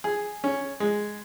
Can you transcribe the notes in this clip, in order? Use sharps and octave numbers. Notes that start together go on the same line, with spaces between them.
G#4
C#4
G#3